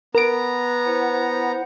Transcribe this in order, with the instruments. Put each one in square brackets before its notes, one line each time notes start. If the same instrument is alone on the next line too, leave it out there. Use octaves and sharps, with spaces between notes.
[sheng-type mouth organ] B3 A#5 [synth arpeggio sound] A#4 D7
[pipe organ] E4 C5 F#5